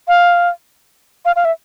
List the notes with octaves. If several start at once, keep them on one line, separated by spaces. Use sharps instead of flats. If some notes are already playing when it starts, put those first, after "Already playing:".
F5
F5
F5
E5